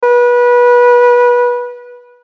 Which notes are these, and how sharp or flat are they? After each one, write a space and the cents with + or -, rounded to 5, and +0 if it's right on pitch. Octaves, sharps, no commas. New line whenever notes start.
B4 -25